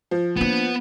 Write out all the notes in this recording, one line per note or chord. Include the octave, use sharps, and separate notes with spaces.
F3
A#3 B3 D4